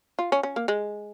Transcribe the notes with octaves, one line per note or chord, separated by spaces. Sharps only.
F4
C#4
C#4
A#3
G#3